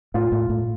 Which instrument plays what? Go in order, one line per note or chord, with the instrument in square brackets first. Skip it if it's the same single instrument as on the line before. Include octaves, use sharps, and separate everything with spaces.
[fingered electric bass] A2 [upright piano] F4
[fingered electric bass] A2
A2